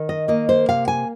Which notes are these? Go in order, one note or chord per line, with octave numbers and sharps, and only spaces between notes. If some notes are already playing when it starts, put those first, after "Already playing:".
Already playing: D#3
D#5
A#3 D#5
C5
C3 F5
G#5